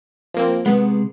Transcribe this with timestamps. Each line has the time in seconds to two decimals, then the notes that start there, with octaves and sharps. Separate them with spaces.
0.34 F3 A#3 C4
0.66 C3 G#3 B3